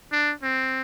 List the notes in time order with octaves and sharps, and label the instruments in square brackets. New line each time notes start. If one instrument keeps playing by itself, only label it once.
[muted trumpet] D4
C4